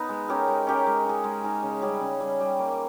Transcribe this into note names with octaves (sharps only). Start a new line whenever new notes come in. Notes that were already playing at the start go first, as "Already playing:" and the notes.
Already playing: B3 D#4
G#3
C#4 G4 A#4
G#3
C#4 G4 A#4
G#3
D#4 G#4
G#3
D#4 G#4
C#3
G3 C#4 G#4
C#3
G3 C#4 G#4
G3
A#3 D#4